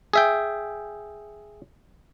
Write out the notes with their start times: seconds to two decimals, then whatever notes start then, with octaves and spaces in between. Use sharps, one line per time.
0.13 G#4 E5 G5